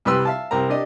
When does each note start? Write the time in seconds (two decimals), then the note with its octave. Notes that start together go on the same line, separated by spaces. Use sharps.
0.05 C2 G3 G4 B4 C6 E6
0.25 E5 F5 A5
0.51 C2 C4 A#4 A#5
0.69 D4 G4 D5 D#5